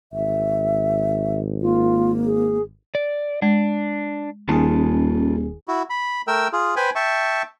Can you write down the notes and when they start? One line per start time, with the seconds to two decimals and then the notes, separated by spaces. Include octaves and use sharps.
0.13 G#1 E5
1.62 A#3 F4
2.26 G#4
2.95 D5
3.42 G#3 D4
4.49 D#1 D#2 D#3 C#4 F4 G#4 A5
5.68 E4 F#4
5.90 B5
6.27 A3 A#4 G5 E6
6.53 F4 G#4
6.76 B4 C5 G5 G#5 B5
6.95 E5 G5 A5 C#6